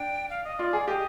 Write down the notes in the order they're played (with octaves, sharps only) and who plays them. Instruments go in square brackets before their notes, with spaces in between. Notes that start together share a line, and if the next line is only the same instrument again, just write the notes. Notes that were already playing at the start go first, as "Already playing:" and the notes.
Already playing: [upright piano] D4 [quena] G5
[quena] F5
D#5
[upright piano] F4 [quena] D5
[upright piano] G#4
[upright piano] G4 [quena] D#5